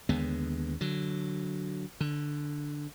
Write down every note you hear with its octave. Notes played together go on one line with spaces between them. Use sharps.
D#2 D3 G#3 B3
D3 F#3
D3